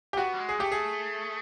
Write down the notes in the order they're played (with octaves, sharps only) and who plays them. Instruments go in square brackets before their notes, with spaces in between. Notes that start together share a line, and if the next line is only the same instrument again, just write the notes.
[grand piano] G4
[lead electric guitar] B3 [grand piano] F#4
[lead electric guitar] G3
G#3
[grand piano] G#4
[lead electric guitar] A3 [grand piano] G4
[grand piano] G#4